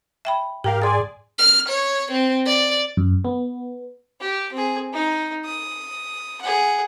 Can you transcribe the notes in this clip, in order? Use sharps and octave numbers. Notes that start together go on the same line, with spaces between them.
E5 G5 B5
G#2 G4 A#4 F5 G5
G#4 D5 G#5 C6 A6
F6
C#5
C4
D5
F#2
B3
G4
C4 G#4
D#4
D#6
G#4 F#5